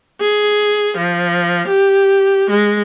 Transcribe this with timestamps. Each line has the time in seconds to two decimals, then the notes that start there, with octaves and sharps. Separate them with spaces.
0.20 G#4
0.98 F3
1.68 G4
2.50 G#3